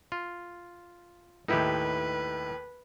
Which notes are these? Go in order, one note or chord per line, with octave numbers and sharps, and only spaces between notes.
F4
D#2 A2 D#4 E4 G4 B4